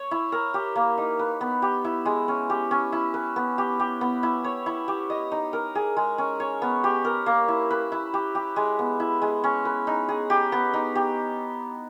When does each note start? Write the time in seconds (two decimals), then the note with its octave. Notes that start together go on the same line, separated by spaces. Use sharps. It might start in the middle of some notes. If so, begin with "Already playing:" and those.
Already playing: C#5
0.11 E4
0.32 A#4
0.54 G4
0.76 A#3
0.98 D#4
1.19 B4
1.41 B3
1.62 G4
1.84 E4
2.05 G#3
2.28 C#4
2.50 G4
2.71 C#4
2.92 E4
3.14 B4
3.36 B3
3.58 G4
3.80 G4
4.01 B3
4.23 E4
4.44 C#5
4.66 E4
4.88 G4
5.10 D#5
5.32 D#4
5.53 A#4
5.75 G#4
5.97 G#3
6.18 C#4
6.40 C#5
6.62 B3
6.84 G4
7.05 A#4
7.26 A#3
7.48 E4
7.71 B4
7.92 E4
8.14 G4
8.35 G4
8.56 G#3
8.79 B3
9.00 E4
9.22 G#3
9.44 C#4
9.65 B4
9.87 D#4
10.09 G#4
10.30 G4
10.52 B3
10.73 D#4
10.95 G4